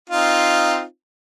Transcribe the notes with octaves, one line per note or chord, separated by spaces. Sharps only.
C4 D#4 F4